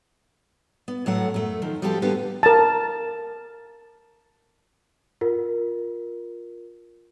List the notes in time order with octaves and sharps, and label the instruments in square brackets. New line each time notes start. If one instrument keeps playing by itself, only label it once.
[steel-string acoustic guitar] B3
A2 F#3 A3 F#5
F#2 A3
D#3 F3
F3 G3 B3 C4 G4 A4
D3 A#3 B3 G4
[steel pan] A#4 A5
[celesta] F4 A#4